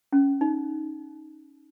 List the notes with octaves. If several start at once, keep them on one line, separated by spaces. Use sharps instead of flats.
C#4
D#4